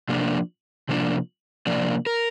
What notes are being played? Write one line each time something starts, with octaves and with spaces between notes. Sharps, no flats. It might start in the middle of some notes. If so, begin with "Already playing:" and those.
C3 F3 A#3 D4
C3 F3 A#3 D4
C3 F3 A#3 D4 D5
A#4